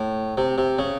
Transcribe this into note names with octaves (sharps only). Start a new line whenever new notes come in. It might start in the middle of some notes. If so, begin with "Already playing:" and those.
Already playing: A2
C3
C3
C#3